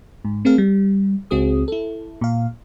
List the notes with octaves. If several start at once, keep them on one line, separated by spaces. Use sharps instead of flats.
G#2
A3 C4 G#4 A#4 F5
G3
C#2 C4 F#4 G#4 D#6
E4 A4
A#2 F5